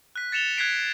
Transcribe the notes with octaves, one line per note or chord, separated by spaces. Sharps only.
F#6 B6
A6 C#7 E7 F7 G7
F#6 G#6 B6 C7 D7